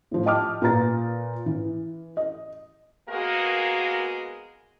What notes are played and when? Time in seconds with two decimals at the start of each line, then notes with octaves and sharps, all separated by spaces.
0.11 A2 F3
0.26 D#5 G5 A5 D6 D#6 F6
0.62 A#2 B4 A#5 A6
1.46 E3
2.17 D#5
3.09 G#3 A#3 B3 F#4 G#4 A#4